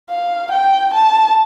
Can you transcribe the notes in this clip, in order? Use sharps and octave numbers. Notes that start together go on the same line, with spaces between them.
F5
G5
A5